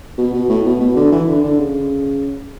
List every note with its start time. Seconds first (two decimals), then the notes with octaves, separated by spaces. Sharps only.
0.18 B2
0.33 B2
0.49 A2
0.65 B2
0.81 B2
0.96 D3
1.12 E3
1.28 D3
1.44 D3
1.59 C#3